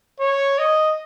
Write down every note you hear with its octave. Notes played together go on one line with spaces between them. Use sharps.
C#5
D#5